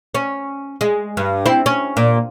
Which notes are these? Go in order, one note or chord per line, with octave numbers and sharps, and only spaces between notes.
C#4
G#3
G2
C4 E4
C#4
A#2